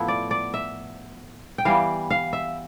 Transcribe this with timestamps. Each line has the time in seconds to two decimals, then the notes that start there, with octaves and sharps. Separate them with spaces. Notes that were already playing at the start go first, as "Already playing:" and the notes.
Already playing: A2 F3 B3 E4
0.08 D5
0.31 D5
0.54 E5
1.58 G5
1.65 E3 G3 B3 F5
2.10 F5
2.33 E5